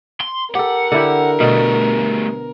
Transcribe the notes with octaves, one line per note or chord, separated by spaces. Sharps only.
C6
G4 A4 A#4 F#5
D3 E4 G4
B2 G3 A3